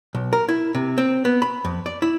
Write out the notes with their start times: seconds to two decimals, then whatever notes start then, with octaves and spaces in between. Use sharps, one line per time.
0.15 B1
0.33 A#4
0.49 E4
0.75 C3
0.98 C4
1.25 B3
1.42 B5
1.65 F2
1.86 D5
2.02 E4